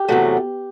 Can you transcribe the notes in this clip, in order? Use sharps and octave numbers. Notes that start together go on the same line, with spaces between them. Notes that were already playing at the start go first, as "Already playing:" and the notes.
Already playing: G4
E2 C3 F#3 A3